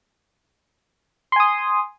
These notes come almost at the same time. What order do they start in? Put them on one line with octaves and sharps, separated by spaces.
C6 G#5 D#6